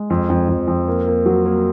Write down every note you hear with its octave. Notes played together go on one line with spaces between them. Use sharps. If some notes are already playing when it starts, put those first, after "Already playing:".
Already playing: G#3
F2
F2
F2
F2
A#3
A#3
F#3
A#3